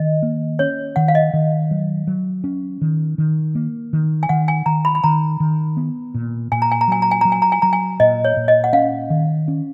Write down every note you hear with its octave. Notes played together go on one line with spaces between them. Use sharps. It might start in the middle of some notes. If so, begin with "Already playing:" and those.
Already playing: D#3 D#5
A#3
C#4 C#5
D#3 F#5
F5
D#5
D#3
F#3
F#3
C#4
D#3
D#3
A#3
D#3
G#5
D#3 F#5
G#5
D#3 A#5
B5
B5
D#3 A#5
D#3
B3
A#2
A#2 G#5
A#5
G#5
A#5
F#3 G#5
A#5
G#5
F#3 A#5
G#5
A#5
G#5
F#3 A#5
G#5
A#2 D#5
C#5
A#2
D#5
F#5
C#4 F5
D#3
C#4